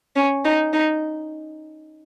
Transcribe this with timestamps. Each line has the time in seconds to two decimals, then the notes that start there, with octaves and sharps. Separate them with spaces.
0.16 C#4
0.45 D#4
0.73 D#4